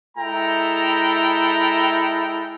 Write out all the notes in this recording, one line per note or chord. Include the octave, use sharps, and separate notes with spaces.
G#3 E4 A4 G5 A#5